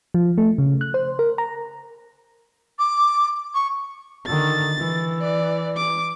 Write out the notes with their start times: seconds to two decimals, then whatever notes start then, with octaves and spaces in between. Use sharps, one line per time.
0.14 F3
0.38 A3
0.58 C#3
0.81 F#6
0.94 C5
1.19 A#4
1.38 A#5
2.79 D6
3.54 C#6
4.26 D3 D#3 A6
4.78 E3
5.21 D5
5.77 D6